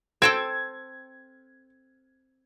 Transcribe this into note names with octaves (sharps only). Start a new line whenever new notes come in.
C4 A4 G5 G#6